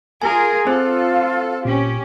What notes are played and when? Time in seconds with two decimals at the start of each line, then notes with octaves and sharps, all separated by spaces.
0.22 F4 G#4 A#4 G#5
0.67 C4 F4 A4 C5
1.65 G1 A#2 C#4 G4